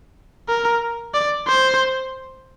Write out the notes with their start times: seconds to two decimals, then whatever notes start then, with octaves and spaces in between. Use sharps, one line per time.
0.49 A#4
1.14 D5
1.47 C5